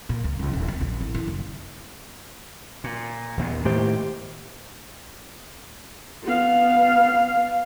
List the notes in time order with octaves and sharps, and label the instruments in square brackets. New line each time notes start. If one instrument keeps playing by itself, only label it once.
[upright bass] A#2
C#2
C#2
D#1
C4
A#1
A1
E3
F#1
[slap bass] A#2
D#2 A#2 B3
[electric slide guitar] A2 G4 C5 [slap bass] D#3 E3 A#3
[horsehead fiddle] B3 F5